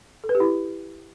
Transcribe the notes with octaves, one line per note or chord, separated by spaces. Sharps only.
A4
B4
G4
E4